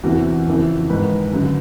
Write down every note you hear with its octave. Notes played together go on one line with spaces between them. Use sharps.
E2 C3 E3 F#4
F2 C#3 E3
G#2 D#3 B4
F#2 D3